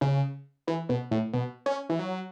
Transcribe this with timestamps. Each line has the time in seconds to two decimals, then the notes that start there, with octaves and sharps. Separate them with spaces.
0.01 C#3
0.67 E3
0.89 B2
1.11 A2
1.33 B2
1.66 C#4
1.89 E3
1.99 F#3